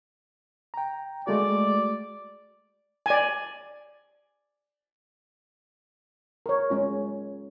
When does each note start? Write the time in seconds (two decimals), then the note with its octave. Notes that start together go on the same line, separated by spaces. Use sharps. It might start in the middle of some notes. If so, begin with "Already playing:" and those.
0.74 G5 A#5
1.27 G#3 A3 F#4 D5
3.06 D5 G#5
6.46 A#4 C#5
6.70 G#3 C#4 F4